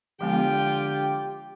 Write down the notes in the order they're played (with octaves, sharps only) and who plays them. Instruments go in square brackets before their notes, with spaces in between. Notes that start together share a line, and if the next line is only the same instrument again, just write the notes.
[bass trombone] D3 [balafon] F3 G#3 B3 [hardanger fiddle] F4 G5 [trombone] G4